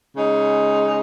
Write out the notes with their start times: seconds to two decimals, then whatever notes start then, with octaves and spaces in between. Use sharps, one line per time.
0.15 C#3 G#3 D#4